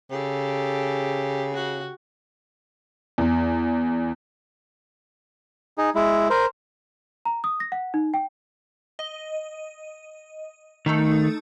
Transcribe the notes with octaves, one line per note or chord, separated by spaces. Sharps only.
C#3 G4 A4
F#4
E2
D#4 G#4
G#3 E4
A#4 C5
A#5
D#6
A#6
F#5
D#4
G5
D#5
D#3 A3 D#4 A4